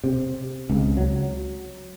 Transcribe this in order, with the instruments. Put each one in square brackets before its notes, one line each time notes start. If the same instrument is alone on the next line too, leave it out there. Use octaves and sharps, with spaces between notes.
[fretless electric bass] C3
C#2
F#3